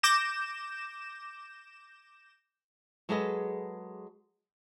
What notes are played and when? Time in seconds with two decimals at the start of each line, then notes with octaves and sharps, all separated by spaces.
0.03 D6 G6 A#6 E7
3.09 F#3 G#3 G#4 A4 B4 D#5